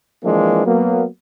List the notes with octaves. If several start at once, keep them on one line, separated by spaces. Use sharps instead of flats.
E3 F3 G#3 A#3 C4 D4
F#3 A#3 B3